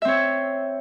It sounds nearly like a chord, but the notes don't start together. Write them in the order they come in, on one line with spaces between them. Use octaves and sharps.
E5 C4 C#5